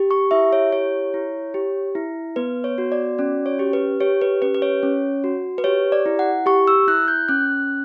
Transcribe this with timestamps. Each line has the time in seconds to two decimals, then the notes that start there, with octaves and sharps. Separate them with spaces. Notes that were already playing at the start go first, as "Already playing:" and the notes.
Already playing: G4
0.11 C#6
0.31 E4 E5
0.53 C#5
0.72 G4 C#5
1.14 E4
1.54 G4
1.95 E4
2.36 B3 B4
2.64 C#5
2.78 F#4
2.92 D5
3.19 C#4 D5
3.46 C#5
3.59 G4
3.73 B4
4.00 G4 C#5
4.21 B4
4.42 C#4 B4
4.54 B4
4.62 C#5
4.83 C#4
5.24 F#4
5.58 B4
5.64 G4 C#5
5.92 D5
6.06 E4
6.19 F#5
6.46 G4 C#6
6.67 E6
6.88 E4 F#6
7.08 G6
7.28 C#4 F#6